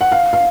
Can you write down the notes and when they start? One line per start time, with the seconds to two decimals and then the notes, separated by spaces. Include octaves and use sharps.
0.01 F#5
0.12 F5
0.33 F5